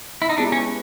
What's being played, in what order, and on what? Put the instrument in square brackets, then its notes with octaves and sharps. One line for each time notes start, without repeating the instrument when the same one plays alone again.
[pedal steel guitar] E4
D#4
[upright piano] G#3 B3 E4 G4 B4 [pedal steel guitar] D4
[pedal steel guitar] C#4